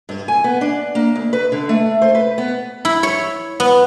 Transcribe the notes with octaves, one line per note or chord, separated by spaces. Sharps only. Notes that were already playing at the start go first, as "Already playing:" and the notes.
G2
G#5
B3
D4
A#3
D2
B4
D3
A3
C5
B4
B3
E4
C#5
B3